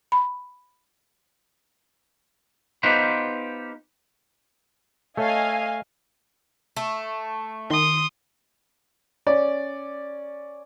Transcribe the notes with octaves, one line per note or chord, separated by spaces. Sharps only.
B5
B3 D#4 F4 G4 B4 C5
A3 A4 C#5 D#5 F5 G#5
A3
D#3 C6 D#6
C#4 D5